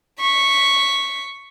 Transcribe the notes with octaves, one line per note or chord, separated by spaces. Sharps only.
C#6 B6